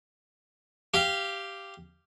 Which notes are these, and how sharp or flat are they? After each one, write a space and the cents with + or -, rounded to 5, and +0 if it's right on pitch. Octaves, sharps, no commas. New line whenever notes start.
G4 +0 F5 -15